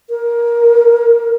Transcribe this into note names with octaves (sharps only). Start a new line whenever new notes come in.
A#4